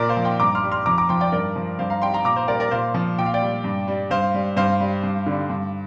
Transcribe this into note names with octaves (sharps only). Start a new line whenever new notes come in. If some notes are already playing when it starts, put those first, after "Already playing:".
Already playing: A#2 A#4 D5
C5 F5
F3
G5 C6
G2 A#5 D6
C6 F6
G3
C6 F6
F2 A#5 D6
A#5 D6
F3 G5 C6
D5 G5
G2 A#4 D5
F3
G2 C5 F5
F5 A#5
G3 G5 C6
F5 A#5
A#2 A#5 D6
C5 F5
G3 A#4 D5
A#4 D5
A#2 C5 F5
F3
A#2 G5
F5
D5 G5
G3
G2
G3
G2 C5 F5
G3
G2 C5 F5
G3
G2
D3 G3
G2